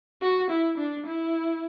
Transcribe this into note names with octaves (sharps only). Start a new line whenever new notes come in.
F#4
E4
D4
E4